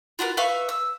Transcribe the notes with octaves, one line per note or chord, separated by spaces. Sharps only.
F4 F#4 A#4 B4
B4 E5 F5 C#6
E6